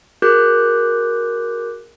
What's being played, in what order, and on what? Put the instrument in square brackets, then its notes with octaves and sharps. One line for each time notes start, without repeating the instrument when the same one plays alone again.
[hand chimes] F#4 G#4 A#4 D6 F#6 G6